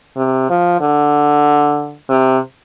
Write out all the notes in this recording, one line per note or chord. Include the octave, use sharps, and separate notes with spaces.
C3
F3
D3
C3